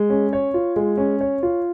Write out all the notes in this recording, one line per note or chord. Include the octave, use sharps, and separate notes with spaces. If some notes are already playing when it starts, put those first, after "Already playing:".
Already playing: G#3
C#4
C#5
F4
G#3
C#4
C#5
F4